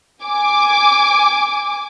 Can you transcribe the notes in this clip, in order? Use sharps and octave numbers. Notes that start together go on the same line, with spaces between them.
G#5 D6